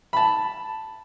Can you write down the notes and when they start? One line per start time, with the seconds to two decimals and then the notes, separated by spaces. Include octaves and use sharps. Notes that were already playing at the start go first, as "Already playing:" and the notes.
0.13 A5 B5